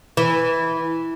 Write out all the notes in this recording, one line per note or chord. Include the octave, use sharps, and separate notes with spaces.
E3